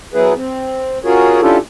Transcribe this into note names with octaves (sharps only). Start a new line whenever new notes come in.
F#3 B3 E4 G#4 B4
C4
C#4 F4 F#4 G#4 A#4 C#5
C#4 D4 E4 F4 G4 A4